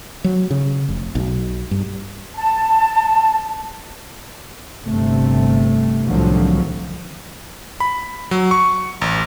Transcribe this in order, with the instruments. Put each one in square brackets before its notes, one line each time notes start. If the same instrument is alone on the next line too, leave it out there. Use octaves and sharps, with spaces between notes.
[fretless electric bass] F#3
C#3
F1
B1
G2
[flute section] A5
[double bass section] G1 C3 A3
C2 A2 D3 D#3 F3 F#3
[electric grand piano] B5
F#3
C#6
A1